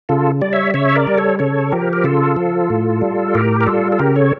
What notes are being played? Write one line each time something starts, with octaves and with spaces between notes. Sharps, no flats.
C#3 F4 A4
G3 D5
C#5 E5
C#3 C#5 E5
A#4 D5
G3
A4 C#5
C#3 A4 C#5
F3 G4 A#4
A#4
C#3 F4 A4
F3
A2
G3
A2 G4 A#4
A#4
G3 F4 A4
A4
C#3 G4 A#4
A4 C#5